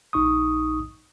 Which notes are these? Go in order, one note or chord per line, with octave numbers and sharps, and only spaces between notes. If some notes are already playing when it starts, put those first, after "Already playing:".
A#1 D#4 C#6 D#6